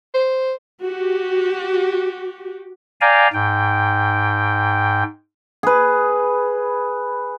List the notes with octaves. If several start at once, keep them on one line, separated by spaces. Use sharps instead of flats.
C5
F#4 G4
D5 F5 G5 G#5 A#5
G#2 G5
G#4 B4